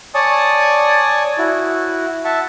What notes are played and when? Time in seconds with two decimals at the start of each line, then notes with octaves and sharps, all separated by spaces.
0.14 C#5 D5 G#5 A5 C#6 D#6
1.38 E4 F#4
2.25 E5 F#5 A5